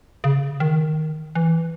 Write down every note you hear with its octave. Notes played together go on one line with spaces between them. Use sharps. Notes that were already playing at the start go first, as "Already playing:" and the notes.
C#3
D#3
E3